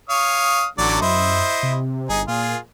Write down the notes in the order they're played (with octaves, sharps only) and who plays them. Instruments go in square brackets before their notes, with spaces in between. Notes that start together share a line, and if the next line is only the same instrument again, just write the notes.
[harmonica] C#5 F5 D#6
[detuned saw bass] A1 [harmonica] D3 F#3 D5
[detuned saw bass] F#2 [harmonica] E4 C5 D#5
[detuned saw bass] C3
[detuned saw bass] G1 [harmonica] D#4 G#4
[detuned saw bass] A#2 [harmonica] F4 G#4